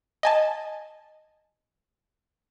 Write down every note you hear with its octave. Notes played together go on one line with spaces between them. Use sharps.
D#5 G#5 A5